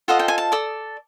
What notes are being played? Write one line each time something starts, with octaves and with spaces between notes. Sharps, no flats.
F4 A4 C5 D#5 F#5
G5
G#5
A5
A4 D5 D#6